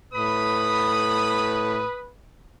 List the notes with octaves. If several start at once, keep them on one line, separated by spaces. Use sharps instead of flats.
A2 B4 B5 D#6